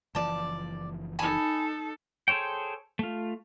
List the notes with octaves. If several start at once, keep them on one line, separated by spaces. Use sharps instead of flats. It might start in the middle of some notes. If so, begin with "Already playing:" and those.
F#1 E3 F3 D5 A5
D#4 A4 G#5 A5 B5
G#4 A4 C5 C#5 G5
A3 F4